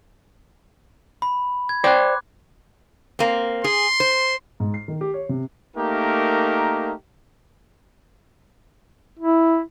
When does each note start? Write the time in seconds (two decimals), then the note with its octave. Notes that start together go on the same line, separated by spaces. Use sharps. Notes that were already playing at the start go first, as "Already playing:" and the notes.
1.22 B5
1.69 G#6
1.84 C5 D5 G5 D6 F#6
3.19 A#3 C4
3.64 G#4 C6
4.00 C5
4.60 G#2
4.74 C7
4.88 D#3
5.01 G4
5.14 C#5
5.29 C3
5.76 A3 A#3 D#4 G4 A#4
9.19 E4